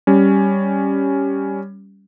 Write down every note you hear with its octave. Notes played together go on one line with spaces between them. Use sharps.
G3 C#4